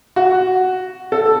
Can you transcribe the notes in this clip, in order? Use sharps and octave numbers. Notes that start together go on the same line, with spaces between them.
F#4
A4